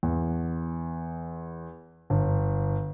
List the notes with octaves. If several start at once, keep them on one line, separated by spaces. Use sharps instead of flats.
E2
G1